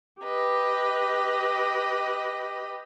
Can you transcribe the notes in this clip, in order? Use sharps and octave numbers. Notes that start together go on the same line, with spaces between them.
G4 B4 D#5